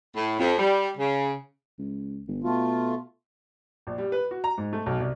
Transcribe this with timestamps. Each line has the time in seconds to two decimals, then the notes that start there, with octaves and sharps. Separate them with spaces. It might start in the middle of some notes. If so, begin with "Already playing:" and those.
0.16 A2
0.39 F2
0.58 G3
0.98 C#3
1.79 C#2
2.28 G1
2.44 B2 A3 F4
3.87 A#1
3.98 G3
4.12 B4
4.31 F#4
4.44 A#5
4.58 G#2
4.73 A3
4.86 B1
5.00 C2